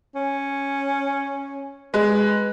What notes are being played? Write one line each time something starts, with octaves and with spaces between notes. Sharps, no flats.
C#4
G#3 B4